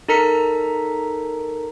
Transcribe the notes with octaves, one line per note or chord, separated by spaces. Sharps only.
D#4 A4 A#4 A#5 B6 C#7